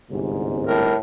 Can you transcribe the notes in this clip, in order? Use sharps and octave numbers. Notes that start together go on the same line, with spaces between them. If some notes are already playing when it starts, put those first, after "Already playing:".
G1 C2 G#2
A2 A#4